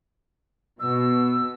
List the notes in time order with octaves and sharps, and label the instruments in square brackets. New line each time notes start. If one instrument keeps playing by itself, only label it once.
[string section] B2 [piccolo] E6